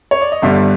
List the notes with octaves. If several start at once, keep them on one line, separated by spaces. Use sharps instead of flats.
C#5
D5
D#5
G1 G2 D3 G3 E5